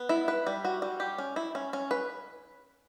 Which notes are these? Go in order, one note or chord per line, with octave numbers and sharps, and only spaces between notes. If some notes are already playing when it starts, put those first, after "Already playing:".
Already playing: B3
E4
B4
G3
F#4
G3
G4
C#4
E4
C#4
C#4
B4